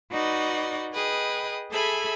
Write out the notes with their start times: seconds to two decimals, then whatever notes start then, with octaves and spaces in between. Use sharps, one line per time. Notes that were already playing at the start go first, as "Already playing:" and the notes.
0.12 D#4 F#4 B4 D5 D#5
0.92 G#4 B4 D#5 G5
1.71 G#4 A4 E5 G#5 B5